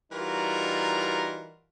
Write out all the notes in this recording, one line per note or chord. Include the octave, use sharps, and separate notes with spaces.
E3 G3 D#4 F4 F#4 A#4